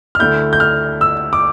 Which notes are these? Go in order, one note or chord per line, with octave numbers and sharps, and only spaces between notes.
F6
D2 D3 A3 E4 G6
G6
F6
E6
D6